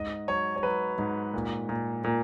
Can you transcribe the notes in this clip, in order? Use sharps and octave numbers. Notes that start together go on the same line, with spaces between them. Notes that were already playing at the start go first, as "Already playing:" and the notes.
Already playing: G#2 D#5
F#3 C#5
C#5
F#3 B4
G#2
A#2
A#2
A#2